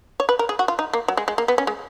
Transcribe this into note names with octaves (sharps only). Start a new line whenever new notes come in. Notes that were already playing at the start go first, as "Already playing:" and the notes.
C#5
B4
A#4
G#4
F#4
F4
D#4
A#3
F#3
G#3
G#3
A#3
B3
C#4
G#3